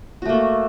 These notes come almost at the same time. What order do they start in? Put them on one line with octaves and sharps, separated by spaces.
F#4 A3 A#3 A4